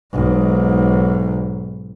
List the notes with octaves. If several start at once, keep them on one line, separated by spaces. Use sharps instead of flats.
B1 G#2